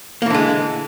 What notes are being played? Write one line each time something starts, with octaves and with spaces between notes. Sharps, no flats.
D3 E3 G#3 A#3